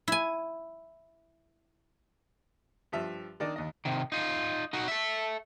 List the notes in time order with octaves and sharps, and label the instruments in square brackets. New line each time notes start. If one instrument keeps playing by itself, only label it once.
[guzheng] E4 G#5
[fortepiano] G2 F3 E5
D#3 D4 D5 D#5
D#2 D#5
[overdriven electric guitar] C3 D#3
D#4 F4
D#4 F#4
A4 E5